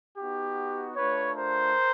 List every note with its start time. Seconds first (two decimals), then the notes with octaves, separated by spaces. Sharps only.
0.17 B3 D#4 F#4 G4
0.96 A3 D4 F4 B4 C#5
1.35 A#4 C5